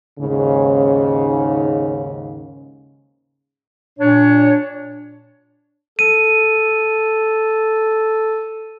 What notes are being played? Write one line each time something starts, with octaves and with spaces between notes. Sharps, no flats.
D#2 G#2 C#3
A#2 D4 C#5
A4 D#7